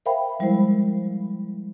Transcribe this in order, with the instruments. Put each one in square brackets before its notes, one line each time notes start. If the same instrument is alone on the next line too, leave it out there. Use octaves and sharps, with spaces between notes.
[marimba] A#4 C5 E5 F5 G5 B5
F3 G3 G#3 E4 A#4 C5